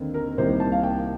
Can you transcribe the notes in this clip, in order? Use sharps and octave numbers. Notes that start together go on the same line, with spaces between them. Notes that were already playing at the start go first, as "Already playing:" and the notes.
Already playing: D#2 D3 C4
A#4
C2 C3 D#3 A#3 D#4 C5
A5
F5
G5